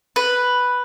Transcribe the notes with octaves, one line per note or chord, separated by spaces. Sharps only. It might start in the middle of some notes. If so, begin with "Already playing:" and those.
B4